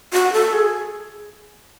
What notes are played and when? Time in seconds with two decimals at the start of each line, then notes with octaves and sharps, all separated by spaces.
0.13 F#4
0.33 A4
0.53 G#4